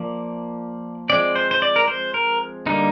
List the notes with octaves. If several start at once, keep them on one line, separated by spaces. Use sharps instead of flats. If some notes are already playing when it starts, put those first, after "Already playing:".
Already playing: F3 A#3 D5
F3 G#3 C4 D5
C5
C5
D5
A#4
C5
A#4
D3 G3 A#3 D#4